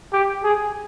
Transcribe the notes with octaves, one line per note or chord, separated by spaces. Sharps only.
G4
G#4